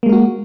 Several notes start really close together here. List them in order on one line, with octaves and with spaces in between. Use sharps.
A#3 G#3 A#4 F#4